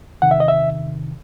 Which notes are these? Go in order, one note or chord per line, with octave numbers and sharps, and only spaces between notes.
E2 C3 D#3 F#5
E5
D#5
E5